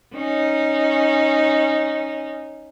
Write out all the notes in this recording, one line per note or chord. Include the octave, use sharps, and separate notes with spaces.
C#4 D#4